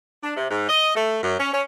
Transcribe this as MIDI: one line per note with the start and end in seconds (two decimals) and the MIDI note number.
0.23 0.34 62
0.36 0.50 48
0.50 0.68 44
0.69 0.93 75
0.96 1.17 57
1.23 1.38 42
1.39 1.50 61
1.53 1.62 61